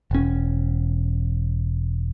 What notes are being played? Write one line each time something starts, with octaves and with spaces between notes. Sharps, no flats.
E1 C#4